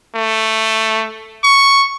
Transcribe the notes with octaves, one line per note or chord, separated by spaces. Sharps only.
A3
C#6